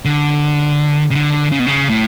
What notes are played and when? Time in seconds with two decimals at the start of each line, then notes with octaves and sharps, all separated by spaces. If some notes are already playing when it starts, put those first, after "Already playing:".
0.05 D3
1.11 C#3
1.15 D3
1.52 C#3
1.59 B2
1.67 C#3
1.89 A2